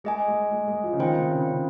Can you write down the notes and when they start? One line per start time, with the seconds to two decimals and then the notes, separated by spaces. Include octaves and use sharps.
0.04 G#3 G#4 D#5 G#5
0.28 G#3
0.51 G#3
0.68 G#3
0.84 F3
0.93 C#3
0.99 D#3 F4 C5 G5
1.16 C3
1.31 C#3
1.47 C#3